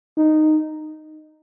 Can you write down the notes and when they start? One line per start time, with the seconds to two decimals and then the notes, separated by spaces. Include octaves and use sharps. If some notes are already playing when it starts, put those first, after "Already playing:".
0.17 D#4